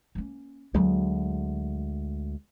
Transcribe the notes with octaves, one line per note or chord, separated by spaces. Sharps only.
A#3 C#4
D2 F#3 G#3 A#3